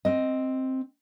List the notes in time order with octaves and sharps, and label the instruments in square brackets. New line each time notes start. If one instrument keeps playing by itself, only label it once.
[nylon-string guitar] C4 D#5